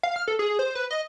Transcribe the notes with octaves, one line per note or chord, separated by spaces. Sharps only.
F5
F6
A4
G#4
C5
B4
D#5